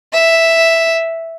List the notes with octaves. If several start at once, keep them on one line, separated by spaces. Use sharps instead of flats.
E5